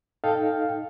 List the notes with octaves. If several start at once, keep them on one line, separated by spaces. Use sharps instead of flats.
D#4 A4 D#5 F5 G5